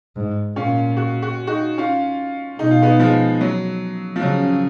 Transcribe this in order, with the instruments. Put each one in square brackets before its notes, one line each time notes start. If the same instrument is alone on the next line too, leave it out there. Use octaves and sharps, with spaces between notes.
[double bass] G#2
[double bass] A#2 [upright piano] C#4 F4
[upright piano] F#4
F#4
D#4 F#4
C#4 F4
[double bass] B2 [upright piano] D#4
[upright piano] F4
B3 D#4
F3 G#3
F#3
F3
[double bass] C#3 [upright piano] F#3